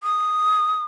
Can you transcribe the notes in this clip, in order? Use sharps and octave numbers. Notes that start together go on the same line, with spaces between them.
D#6